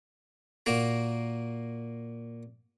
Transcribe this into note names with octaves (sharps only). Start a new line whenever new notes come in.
A#2 A#3 F#4 A#5